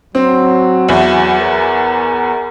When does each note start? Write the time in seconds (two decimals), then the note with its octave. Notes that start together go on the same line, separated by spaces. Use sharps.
0.15 F#3 C4
0.88 E2 E3
1.40 A#4